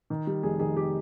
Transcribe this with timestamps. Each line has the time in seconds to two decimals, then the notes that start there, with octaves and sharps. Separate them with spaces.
0.10 D#3
0.27 G3
0.43 F1 G#4
0.60 D#3 G#4
0.77 G4